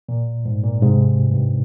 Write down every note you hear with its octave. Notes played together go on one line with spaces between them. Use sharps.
A#2
G#2
A#2
G#2 C3
G2